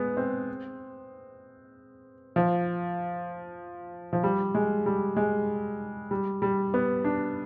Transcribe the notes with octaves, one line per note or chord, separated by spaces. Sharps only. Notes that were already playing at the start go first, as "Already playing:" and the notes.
Already playing: G#3 B3
C4
F3
F3
G3
G#3
G3
G#3
G3
G3
B3
D4